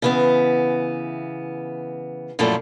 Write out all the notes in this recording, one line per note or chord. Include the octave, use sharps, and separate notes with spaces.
C#3 E3 B3
F#2 A#2 F3 A3 E4